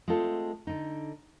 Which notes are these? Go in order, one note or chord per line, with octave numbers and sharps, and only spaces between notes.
G#3 A3 C4 F4 A4
D3 D#4